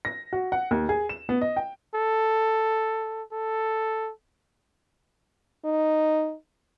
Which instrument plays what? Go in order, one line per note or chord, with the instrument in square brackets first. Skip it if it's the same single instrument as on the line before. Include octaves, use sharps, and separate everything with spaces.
[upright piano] A#6
F#4
F#5
D#2
G#4
E7
B3
D#5
G5
[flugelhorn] A4
A4
[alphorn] D#4